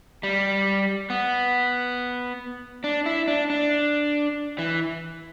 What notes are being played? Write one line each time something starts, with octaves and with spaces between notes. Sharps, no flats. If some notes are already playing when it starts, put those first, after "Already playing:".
G3
B3
D4
E4
D4
D4
E3